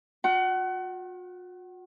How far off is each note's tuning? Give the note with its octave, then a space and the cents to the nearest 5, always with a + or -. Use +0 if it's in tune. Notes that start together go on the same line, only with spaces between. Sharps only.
F#4 -45 F#5 +30